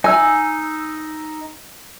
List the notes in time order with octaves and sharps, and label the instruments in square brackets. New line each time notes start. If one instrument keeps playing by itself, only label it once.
[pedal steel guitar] D#4 E6 [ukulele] G#5